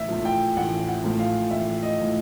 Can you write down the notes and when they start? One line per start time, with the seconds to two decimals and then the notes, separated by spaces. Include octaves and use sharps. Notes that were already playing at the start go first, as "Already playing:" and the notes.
Already playing: A1 E5
0.09 A2 F3
0.25 G5
0.56 A1 F#5
0.88 F#5
1.04 A2 F3
1.19 F5
1.51 A1 E5
1.83 D#5
1.99 A2 F3